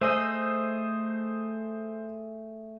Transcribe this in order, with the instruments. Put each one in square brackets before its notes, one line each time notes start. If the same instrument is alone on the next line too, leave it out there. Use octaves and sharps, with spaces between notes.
[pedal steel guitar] A3 G#4 D#5 [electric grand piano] C5 D#6 E6